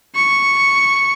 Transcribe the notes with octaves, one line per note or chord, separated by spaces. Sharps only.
C#6